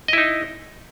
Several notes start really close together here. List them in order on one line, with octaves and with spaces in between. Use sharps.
D#5 E4 D#4